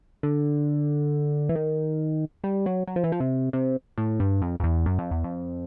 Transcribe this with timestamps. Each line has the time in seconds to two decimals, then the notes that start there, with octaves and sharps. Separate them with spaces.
0.23 D3
1.49 E3
1.56 D#3
2.44 G3
2.66 F#3
2.88 F#3
2.96 F3
3.04 E3
3.12 F3
3.20 C3
3.53 C3
3.98 A2
4.20 G2
4.42 F2
4.60 F2
4.64 E2
4.86 F#2
4.99 F2
5.11 E2
5.24 F2